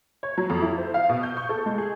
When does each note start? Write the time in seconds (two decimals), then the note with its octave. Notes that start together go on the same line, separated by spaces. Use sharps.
0.23 C#5
0.38 F#3
0.50 F2
0.62 E4
0.78 C5
0.94 F5
1.09 B2
1.23 G6
1.37 C#6
1.49 A4
1.66 G#3
1.78 G#4